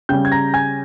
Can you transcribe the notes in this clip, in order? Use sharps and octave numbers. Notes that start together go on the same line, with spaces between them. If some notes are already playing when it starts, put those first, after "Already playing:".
C#3 G3 C#4 G5 G6
G#6
A#5 A#6
G#5 G#6